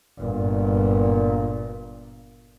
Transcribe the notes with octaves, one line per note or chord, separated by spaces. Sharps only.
G1 A#2